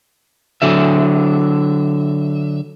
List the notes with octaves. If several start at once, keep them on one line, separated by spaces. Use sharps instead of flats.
D3 F#3 E5